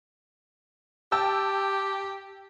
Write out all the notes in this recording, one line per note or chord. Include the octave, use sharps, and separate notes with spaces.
G4 G5 A5 E6